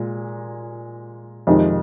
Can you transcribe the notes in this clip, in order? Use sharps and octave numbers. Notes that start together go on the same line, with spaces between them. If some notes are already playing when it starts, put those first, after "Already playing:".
Already playing: A#2 G#3
F2 C3 D#3 G#3